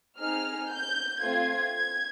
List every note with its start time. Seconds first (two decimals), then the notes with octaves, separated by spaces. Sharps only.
0.19 C4 D#4 G#4 F6
0.70 G6
1.20 A3 C4 F4 G#6